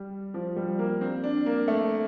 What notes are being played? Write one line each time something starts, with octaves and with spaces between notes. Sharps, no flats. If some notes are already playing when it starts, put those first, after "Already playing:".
Already playing: G3
F3
G3
A#3
C4
D4
A#3
A3